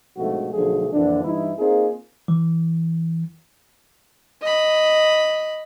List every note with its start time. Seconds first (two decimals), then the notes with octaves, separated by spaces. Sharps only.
0.17 A#1 G#2 B2 F3 A3 F#4
0.54 B1 B2 D3 F3 A3 G#4
0.93 F2 A#2 D3 E3 D4
1.24 G2 E3 D#4 E4
1.59 A#3 C4 D#4 F4 G#4
2.28 E3
4.42 D#5 B5